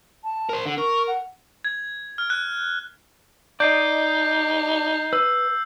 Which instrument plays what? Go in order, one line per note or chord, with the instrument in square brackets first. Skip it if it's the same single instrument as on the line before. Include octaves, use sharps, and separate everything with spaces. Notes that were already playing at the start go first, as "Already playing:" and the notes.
[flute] A5
[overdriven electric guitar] A#4 C5
[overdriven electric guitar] D3 [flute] F#5
[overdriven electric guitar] A#4 [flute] C#6
[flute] F#5
[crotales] G#6
F6
F#6
[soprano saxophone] D#4 [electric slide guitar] D5 D#5 [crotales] G6 C7
[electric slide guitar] B4 [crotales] E6